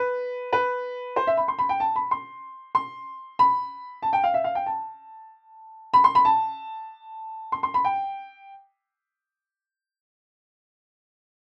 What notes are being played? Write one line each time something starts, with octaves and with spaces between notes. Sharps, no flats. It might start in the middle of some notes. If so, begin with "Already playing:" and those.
Already playing: B4
B4
C5
E5
B5
C6
B5
G5
A5
B5
C6
C6
B5
A5
G5
F5
E5
F5
G5
A5
B5
C6
B5
A5
C6
C6
B5
G5